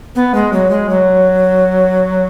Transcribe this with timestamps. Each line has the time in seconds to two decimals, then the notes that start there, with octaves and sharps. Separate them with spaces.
0.15 B3
0.35 G#3
0.53 F#3
0.71 G#3
0.89 F#3